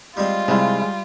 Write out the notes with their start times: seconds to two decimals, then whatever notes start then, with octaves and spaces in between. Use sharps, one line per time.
0.17 G3 G#3 C4 F4
0.48 C3 G3 G#3 E4 F5